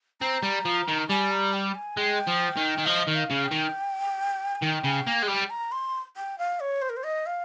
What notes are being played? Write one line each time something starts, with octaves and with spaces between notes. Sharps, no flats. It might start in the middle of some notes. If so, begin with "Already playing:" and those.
C4 A#5
G3
F3
D#3
G3 G#5
A#5
G5
G#5
G#3 G5
F3
D#3
D#3
F3 D#5
D#3
F5
C#3
G5
D#3
G#5
D#3 G5
C#3
A#3
G#3
G3
A#5
C6
G5
F5
C#5
C5
A#4
C5
D#5
F5